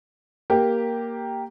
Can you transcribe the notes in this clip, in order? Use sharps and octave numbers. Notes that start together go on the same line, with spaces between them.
A#3 G4 A#4